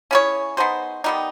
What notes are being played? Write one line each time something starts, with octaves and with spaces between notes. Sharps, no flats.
C#4 E4 G#4 C#5
B3 D#4 G#4 C5
D#3 G3 B3 D#4